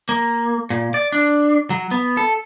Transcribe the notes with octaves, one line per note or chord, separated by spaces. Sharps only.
A#3
A#2
D5
D4
F#3
B3
A4